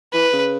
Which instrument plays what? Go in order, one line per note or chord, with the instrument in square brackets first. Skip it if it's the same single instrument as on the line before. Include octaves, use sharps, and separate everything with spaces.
[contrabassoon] E3 [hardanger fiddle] B4
[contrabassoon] C#3